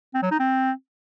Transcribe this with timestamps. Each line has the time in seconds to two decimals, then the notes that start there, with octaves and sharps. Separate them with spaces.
0.14 C4
0.23 F#3
0.31 D#4
0.40 C4